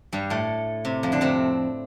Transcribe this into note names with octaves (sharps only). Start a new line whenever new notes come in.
G2 G3
A2 A3
C3
F2 F3
D3 D4
C3 C4